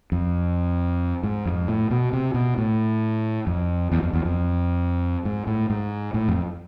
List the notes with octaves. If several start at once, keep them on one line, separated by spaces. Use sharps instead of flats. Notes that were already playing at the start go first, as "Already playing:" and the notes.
F2
G#2
F2
A2
B2
C3
B2
A2
F2
E2
F2
E2
F2
G#2
A2
G#2
A2
F2